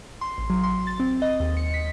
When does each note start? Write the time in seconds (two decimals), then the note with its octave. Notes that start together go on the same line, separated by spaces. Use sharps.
0.21 C6
0.38 A1
0.50 F#3
0.64 C6
0.87 A6
1.00 C4
1.22 D#5
1.40 D#2
1.57 C#7
1.74 B6